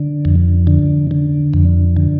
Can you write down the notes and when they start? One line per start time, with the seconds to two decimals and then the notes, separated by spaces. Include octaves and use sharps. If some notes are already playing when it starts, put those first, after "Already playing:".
Already playing: D3
0.25 F2
0.67 D3
1.11 D3
1.54 F2
1.97 D3